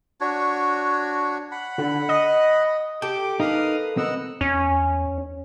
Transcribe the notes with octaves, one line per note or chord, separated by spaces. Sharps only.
D4 F#4 C#5
F#5 B5
D3
D#5
G4 A4 G5 D6
D#4 A#4 B4 F5 D#6
C4 A#4 B4 D#5 F#5 E6
E2 C#4